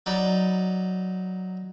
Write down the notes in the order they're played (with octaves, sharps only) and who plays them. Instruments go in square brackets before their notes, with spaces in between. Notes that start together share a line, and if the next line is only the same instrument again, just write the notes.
[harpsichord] F#3 D#4 D5 B5